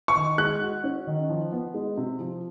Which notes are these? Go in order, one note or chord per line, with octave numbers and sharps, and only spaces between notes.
C#6
D#3
G#3 F#6
F#4
C#4
D#3
F3
B3
G#3
C3
F3